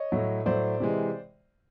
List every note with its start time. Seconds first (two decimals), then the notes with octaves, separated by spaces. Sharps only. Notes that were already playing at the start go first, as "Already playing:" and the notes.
Already playing: C#5 D#5
0.12 A2 F#3 A3
0.46 A2 F#3 A3 C5 D5
0.80 C3 E3 G#3